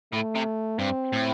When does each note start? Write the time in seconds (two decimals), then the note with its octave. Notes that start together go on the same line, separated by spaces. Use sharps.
0.13 A2 A3
0.35 C3
0.79 G2 C4
1.13 A2